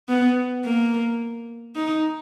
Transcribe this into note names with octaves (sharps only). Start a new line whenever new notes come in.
B3
A#3
D#4